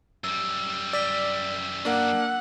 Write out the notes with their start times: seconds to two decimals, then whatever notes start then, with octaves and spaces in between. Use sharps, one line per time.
0.24 F#2 G3 E6
0.93 D5 E6 B6 G7
1.85 A#3 D4 F#5